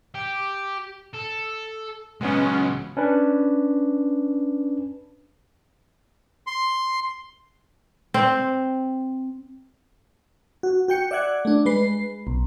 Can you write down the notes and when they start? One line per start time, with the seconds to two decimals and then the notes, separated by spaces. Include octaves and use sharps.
0.15 G4
1.14 A4
2.21 C#2 F#3 G#3 B3 C#4
2.97 C#4 D4 B4
6.47 C6
8.14 C4
10.63 F#4
10.88 F#4 G5 C#7
11.11 D5 E5 F#5 F#6 G#6
11.45 A3 D4
11.66 G#3 B4 C7
12.27 B1